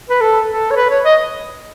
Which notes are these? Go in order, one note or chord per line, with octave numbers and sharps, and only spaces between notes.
B4
A4
A4
C#5
B4
C#5
D#5